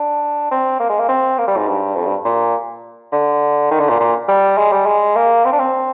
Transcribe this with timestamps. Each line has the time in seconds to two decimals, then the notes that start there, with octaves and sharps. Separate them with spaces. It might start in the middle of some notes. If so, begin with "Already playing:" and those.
Already playing: D4
0.51 C4
0.80 A#3
0.89 G#3
0.99 A#3
1.09 C4
1.38 A#3
1.48 G3
1.57 G#2
1.67 G2
1.96 F2
2.06 G2
2.25 A#2
3.12 D3
3.71 D#3
3.79 D3
3.89 A#2
4.00 A#2
4.28 G3
4.58 G#3
4.72 G3
4.86 G#3
5.16 A#3
5.45 C4
5.53 D4
5.60 C4